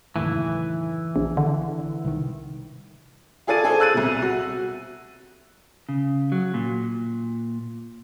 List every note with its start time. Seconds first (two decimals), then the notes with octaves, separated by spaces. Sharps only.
0.16 F#1 D#2 A2 E3
1.16 A#1
1.37 D3
2.05 C2 D#3
3.47 F4 G#4 A4 D5 A6 D#7
3.64 G#4 A4 C5
3.80 E6 F#6 A6 D#7
3.94 C2 B2
4.22 F#4
5.89 C#3
6.32 F#3
6.54 A#2